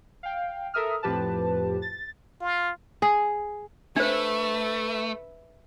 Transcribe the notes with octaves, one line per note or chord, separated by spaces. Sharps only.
F5 G5
A4 A#4 E5 D#6 F6
F2 A2 F3 G4 B4 A5
A6
F4
G#4
A3 D4 B4 C5 E5